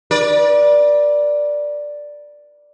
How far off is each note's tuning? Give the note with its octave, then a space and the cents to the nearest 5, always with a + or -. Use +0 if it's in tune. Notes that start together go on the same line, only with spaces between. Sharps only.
B4 -45 D5 +0